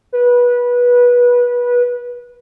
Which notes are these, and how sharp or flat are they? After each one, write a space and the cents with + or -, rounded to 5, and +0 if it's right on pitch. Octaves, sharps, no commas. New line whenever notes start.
B4 -25